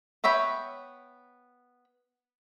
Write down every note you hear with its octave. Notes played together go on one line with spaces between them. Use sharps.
B3 C#5 E5 G5 B5